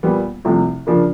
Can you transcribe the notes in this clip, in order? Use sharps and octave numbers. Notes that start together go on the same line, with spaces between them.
A#2 G3 B3
C2 C3 F3 A3
C#3 F3 A#3 D4